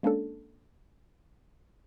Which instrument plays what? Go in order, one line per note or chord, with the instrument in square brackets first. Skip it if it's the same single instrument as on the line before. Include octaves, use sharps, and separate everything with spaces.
[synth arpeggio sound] G#3 A#3 C#4 D4 A4